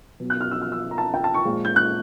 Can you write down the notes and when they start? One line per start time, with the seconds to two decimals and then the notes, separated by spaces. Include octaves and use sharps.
0.20 B2 F#3
0.30 F#6
0.41 F6
0.51 E6
0.62 F6
0.72 E6
0.91 A#5
0.98 A5
1.14 G5
1.24 A5
1.34 C#6
1.45 A#2 F3 G#3
1.65 G6
1.76 F#6